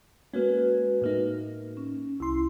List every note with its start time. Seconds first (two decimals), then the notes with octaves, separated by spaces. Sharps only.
0.34 G#3 A#3 C#4 F#4 B4
1.01 A2 A#3 D#4
1.77 C#4
2.20 C2 E4 C6